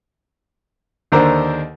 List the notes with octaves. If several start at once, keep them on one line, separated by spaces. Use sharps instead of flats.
D#2 D3 D4 A#4 C5 A#5